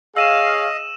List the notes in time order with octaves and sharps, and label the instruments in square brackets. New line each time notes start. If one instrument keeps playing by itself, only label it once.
[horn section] G#4 C#5 F5 [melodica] D#5 [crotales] E6 D#7 E7